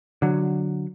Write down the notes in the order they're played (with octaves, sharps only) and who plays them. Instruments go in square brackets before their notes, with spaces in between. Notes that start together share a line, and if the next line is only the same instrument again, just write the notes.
[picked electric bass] D3 F#3